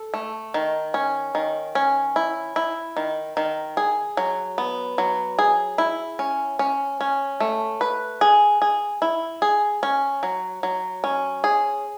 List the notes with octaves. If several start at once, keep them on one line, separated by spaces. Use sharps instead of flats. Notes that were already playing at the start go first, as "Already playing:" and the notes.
Already playing: A4
A3
D#3
C#4
D#3
C#4
E4
E4
D#3
D#3
G#4
F#3
B3
F#3
G#4
E4
C#4
C#4
C#4
A3
B4
G#4
G#4
E4
G#4
C#4
F#3
F#3
C#4
G#4